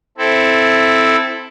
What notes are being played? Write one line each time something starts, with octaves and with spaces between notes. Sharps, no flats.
C4 E4 A4